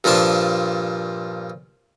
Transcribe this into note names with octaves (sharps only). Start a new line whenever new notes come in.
G2 A#2 F3 D4 A5